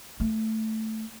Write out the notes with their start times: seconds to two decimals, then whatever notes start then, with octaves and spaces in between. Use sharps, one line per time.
0.20 A3